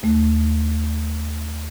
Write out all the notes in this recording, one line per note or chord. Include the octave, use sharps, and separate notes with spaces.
D#2 A3